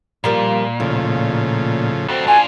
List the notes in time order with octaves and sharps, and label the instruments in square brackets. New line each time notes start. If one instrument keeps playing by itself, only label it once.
[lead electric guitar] A#2 [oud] F3 G3 A#3
[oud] D#2 [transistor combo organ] A2 C#3 F3
[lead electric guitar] D2 C4 [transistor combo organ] F#4 A4
[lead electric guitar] D4 F4 [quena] G#5